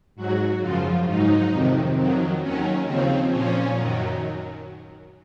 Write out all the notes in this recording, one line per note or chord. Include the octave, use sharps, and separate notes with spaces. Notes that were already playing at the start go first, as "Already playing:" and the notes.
G#2 F#3 F#4
F#2 C#3 F3 F4
G#2 F#3 D#4
F2 C3 D#3
F2 D#3 F#3
D#2 D#3 F#3 C#4
D#2 C#3 F3 C4
A#2 F3 C#4
F#2 D#3 F#3